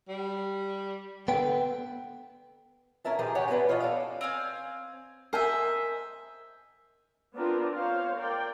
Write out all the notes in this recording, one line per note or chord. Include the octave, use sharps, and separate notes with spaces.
G3
D3 B3 G5
C#4 E4 A#4 E5 A5
E3 F3 G4 G#4 A#4
G4 C#5 F#5 G#5
E3 F#3 B3 D4 B4
F4 C#5 D#5 F#5
A4 D5 F5
C4 F5 G#5
A#4 C5 D#5 E5 G#5
B3 C4 D4 F4 A#4 B4
C5 C#5 F5
A#4 D5 G5